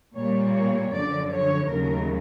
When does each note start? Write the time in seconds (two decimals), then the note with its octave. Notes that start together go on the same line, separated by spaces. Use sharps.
0.14 A#2 G3 A#3 C#5
0.53 C#5
0.92 F#2 D3 F3 D5
1.31 C#5
1.69 D#2 C#3 F#3 A3 A#4